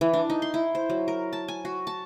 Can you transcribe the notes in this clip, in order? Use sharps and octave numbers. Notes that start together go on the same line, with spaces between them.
E3
D4
D#4
C6
E4
C5
F#3
A#4
A5
G#5
F#4
A5